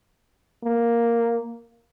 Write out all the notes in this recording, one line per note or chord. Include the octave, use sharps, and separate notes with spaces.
A#3